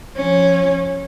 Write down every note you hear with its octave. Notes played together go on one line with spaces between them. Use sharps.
F3 C#4